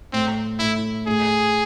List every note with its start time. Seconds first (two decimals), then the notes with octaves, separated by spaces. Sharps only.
0.13 A2 C4
0.59 A2 E4
1.06 A2 G#4